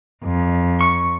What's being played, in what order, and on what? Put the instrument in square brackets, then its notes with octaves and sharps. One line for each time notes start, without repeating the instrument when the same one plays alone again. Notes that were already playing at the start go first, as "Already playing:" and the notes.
[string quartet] F2
[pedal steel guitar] C#6